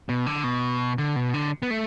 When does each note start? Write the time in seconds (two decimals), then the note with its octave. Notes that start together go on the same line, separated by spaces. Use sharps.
0.09 B2
0.26 D3
0.44 B2
0.98 D3
1.16 B2
1.34 D3
1.62 B3
1.71 A3